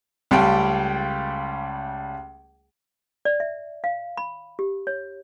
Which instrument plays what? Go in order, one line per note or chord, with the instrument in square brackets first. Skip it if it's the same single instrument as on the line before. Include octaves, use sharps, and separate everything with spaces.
[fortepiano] C#2 G3 A3 F5 G5
[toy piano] D5
E5
F5
B5
G4
C#5